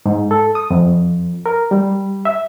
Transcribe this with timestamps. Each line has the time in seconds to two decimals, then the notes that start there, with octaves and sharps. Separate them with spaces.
0.06 G#2
0.31 A4
0.55 D#6
0.70 F2
1.46 A#4
1.71 G3
2.25 E5